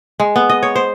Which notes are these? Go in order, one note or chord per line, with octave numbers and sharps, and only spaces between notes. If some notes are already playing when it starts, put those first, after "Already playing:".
G#3
B3
D#5
C#5
C5